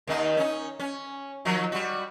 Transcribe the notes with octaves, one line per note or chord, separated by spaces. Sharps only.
D#2 D#3 D#4
C#4 D#4
C#4
D#3 F3 F#3
G3 F#4